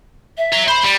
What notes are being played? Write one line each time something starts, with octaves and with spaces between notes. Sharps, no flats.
E5
C#5 A#5
C5 B5
G3